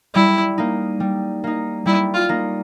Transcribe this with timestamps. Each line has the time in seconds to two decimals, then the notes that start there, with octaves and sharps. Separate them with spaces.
0.14 G3 E4
0.58 A#3 D#4
1.00 G3
1.44 A#3 D#4
1.86 G3 E4
2.14 F4
2.29 A#3 D#4